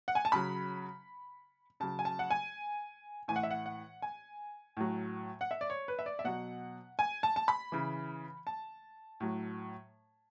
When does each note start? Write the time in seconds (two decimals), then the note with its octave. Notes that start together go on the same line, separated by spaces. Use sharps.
0.08 F#5
0.15 G#5
0.25 A5
0.32 C#3 F#3 B5
1.80 C#3 F#3 A5
1.99 G#5
2.05 A5
2.19 F#5
2.31 G#5
3.28 A2 E3 G#5
3.36 F#5
3.43 E5
3.51 F#5
3.66 F#5
4.02 G#5
4.77 A2 F#3
5.41 F#5
5.51 E5
5.61 D5
5.70 C#5
5.88 B4
5.99 E5
6.06 D5
6.19 E5
6.24 B2 F#3 F#5
6.99 G#5
7.23 A5
7.36 A5
7.48 B5
7.72 C#3 E3
8.47 A5
9.20 A2 F#3